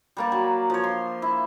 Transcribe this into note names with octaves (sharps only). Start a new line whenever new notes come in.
G3 A#3 D5
F#3
F3 C#5
C6
E4